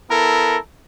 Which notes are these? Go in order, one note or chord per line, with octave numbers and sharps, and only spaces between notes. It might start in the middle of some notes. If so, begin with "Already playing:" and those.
B3 E4 A4 A#4